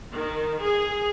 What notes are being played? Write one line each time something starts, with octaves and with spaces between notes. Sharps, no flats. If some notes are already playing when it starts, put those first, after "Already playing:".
D#3
G#4